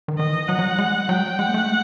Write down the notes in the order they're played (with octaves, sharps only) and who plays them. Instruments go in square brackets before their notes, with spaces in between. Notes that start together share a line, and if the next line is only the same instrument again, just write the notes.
[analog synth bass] D#3
[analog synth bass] D#3 [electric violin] D#5
[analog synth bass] E3
[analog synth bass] F#3 [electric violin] F#5
[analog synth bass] F#3
G3
G#3
G3
[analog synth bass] F#3 [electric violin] G5
[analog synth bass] G3
[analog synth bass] G#3 [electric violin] F#5
[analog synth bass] A#3
A3